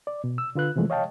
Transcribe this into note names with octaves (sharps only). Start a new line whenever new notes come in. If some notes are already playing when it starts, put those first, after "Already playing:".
D5
B2
E6
D3 F4 B4 F#6
C3 E3 F3 G#3 A3
C#5 D#5 F5 G5 A5